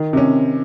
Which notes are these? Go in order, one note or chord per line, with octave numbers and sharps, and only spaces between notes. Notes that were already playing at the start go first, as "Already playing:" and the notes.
Already playing: D#3
C3 C#4